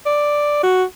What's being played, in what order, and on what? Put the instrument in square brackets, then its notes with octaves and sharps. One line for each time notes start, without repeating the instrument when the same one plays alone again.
[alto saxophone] D5
F#4